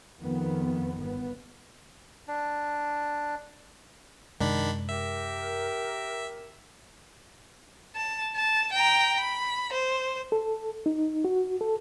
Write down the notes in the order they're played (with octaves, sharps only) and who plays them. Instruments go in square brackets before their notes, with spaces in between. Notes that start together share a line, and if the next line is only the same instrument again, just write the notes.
[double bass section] F2 D#3 B3
G1 B3
[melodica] D4
[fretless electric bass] F#2 C3 G#3 [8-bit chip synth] D#3 D4 B5
[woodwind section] G4 A#4 [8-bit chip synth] E5
[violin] A5
A5
G5 A#5
B5
C5
[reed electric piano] A4
D#4
F#4
A4